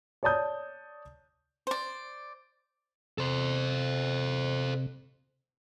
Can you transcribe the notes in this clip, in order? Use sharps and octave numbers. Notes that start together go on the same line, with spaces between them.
C#5 D5 A5 D#6 G6
C5 D5
C3 A4 C5